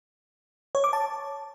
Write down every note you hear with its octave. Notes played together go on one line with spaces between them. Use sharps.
C#5
D6
A5